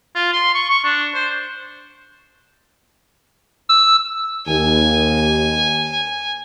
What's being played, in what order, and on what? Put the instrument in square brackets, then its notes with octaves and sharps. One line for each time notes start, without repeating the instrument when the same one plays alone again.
[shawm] F4
C6
C#6
C#6
D4
C5
[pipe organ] E6
[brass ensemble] D#2 [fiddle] G#5